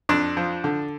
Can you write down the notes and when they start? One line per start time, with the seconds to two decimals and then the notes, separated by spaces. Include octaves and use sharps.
0.09 F2 D4
0.37 F3
0.64 D3